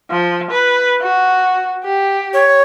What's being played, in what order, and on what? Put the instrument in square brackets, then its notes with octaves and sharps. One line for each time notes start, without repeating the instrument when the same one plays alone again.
[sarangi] F3
B4
F#4
G4
[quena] C#5